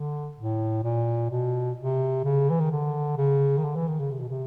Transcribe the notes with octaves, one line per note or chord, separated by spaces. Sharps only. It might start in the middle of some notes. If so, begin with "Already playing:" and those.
Already playing: D3
A2
A#2
B2
C3
C#3
E3
D#3
D3
C#3
D#3
D3
E3
D#3
C#3
C3
B2
C3